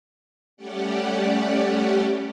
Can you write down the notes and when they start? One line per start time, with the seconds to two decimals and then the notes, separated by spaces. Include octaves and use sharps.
0.57 G3 A3 C#4 G4 D5 F#5